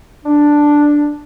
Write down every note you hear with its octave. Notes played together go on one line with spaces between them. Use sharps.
D4